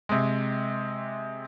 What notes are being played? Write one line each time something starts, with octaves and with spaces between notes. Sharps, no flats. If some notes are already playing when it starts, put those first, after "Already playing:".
C3 G#3